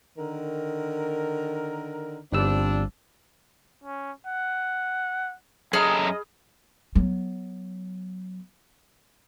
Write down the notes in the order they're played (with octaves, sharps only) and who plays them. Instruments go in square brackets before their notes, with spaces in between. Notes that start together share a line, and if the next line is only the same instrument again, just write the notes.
[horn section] D3 D#3 A#4
[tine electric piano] G1 G3 E6 [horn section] F3 C4 D4
[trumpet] C#4
F#5
[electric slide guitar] F#2 A4 A#5 [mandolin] G#4 B5 F6 [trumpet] D#5
[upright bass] F#3 B3